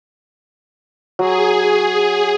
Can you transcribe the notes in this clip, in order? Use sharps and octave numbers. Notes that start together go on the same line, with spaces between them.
F#3 G#4